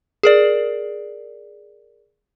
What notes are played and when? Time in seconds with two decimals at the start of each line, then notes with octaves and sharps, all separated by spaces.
0.23 G#4 A#4 D5